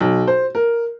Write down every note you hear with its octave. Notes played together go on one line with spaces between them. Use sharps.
B1
C5
A#4